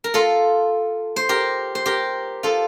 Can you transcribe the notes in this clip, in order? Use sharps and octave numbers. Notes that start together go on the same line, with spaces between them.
A#4
F4 A4
C5
G4 A#4
C5
G4 A#4
F4 A4